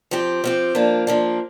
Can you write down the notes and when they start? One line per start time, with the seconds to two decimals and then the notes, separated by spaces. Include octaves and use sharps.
0.11 F3 C4 G4
0.44 F3 C4 G4
0.75 F3 A#3 D4
1.07 F3 A#3 D4